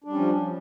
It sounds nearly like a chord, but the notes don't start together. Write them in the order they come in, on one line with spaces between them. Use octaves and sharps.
D4 G3 C#4 F3